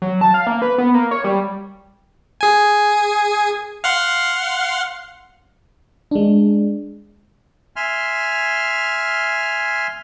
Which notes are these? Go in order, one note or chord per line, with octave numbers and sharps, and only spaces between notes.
F#3
A5
F5
A#3
B4
B3
A#3
C#5
G3
G#4 G#5
F5 F#5 C6
G#3 D4
E5 G#5 C6 F6